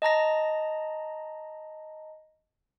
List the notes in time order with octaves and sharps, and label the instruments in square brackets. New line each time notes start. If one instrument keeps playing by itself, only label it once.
[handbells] D#5 A5 A#5 A#6